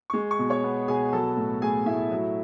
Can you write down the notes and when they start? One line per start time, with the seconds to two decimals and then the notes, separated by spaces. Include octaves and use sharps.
0.10 G#3 C#6
0.31 C#6
0.39 B2
0.50 C#5 C#6
0.64 B3
0.88 B2 G#4 G#5
1.13 F#3 A4 A5
1.37 A2
1.61 A3 G#4 G#5
1.86 A2 E4 E5
2.11 F#3